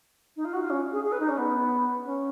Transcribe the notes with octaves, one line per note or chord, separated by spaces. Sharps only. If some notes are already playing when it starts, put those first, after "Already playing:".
D#4
F4
F#4
F4
C#4
G#4
G#4
B4
D#4
C#4
B3
C#4